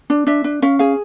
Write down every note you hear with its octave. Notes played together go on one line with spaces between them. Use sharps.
D4
D4 E5
D4
C#4 F5
G#4 F5